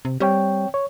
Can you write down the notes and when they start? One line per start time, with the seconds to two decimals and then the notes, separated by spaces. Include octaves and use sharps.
0.05 C3
0.20 G3 C4 C#5 G5
0.74 C#5